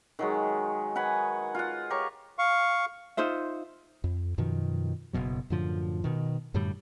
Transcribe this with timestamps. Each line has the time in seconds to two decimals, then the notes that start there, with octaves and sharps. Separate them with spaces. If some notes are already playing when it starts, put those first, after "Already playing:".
0.19 D#3 F#3 G#3
0.95 B4 F#5 G#5 B5
1.55 F4 F#5
1.90 G4 A#4 C#5 C#6
2.39 F5 C#6
3.17 D#4 F4 C5 E5
4.04 F2
4.38 F#2 B2 D#3 F3
5.13 F#1 B1 B2 F#3
5.50 F#2 A2 D3 F3
6.04 B2 D#3
6.54 F#2 A2 D3 G3